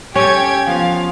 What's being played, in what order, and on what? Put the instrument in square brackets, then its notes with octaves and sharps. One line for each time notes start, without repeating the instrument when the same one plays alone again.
[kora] C#4 [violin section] G4 G5 G#6 [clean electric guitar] A4 C#5
[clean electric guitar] F3 B3 [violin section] F5